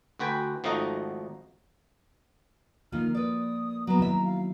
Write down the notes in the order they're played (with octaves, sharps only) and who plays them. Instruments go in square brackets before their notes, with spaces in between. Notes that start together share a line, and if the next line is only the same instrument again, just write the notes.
[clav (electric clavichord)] D2 F#4 B4 G5 G#5
G#1 F3 A3 D#4 F#4 D#5
[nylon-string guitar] D#3 F4 [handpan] F3 A#3 [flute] F6
[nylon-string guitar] B4 D5 [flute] D#6
[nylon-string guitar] F#3 B3 [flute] A#5
[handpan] D#3 F#3 [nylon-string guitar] E4 E5
[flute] F5